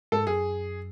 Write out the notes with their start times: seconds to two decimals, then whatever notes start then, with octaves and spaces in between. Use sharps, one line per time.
0.12 G#2 A4
0.27 F#2 G#4